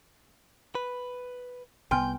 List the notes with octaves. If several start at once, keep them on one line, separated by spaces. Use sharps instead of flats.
B4
C2 B3 G5 G#5 C6 F6